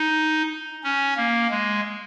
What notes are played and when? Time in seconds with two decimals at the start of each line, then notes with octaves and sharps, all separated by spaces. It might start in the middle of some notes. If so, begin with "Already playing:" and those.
Already playing: D#4
0.84 C#4
1.17 A#3
1.50 G#3